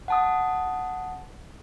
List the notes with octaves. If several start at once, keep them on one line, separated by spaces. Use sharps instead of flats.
F#5 A5 D#6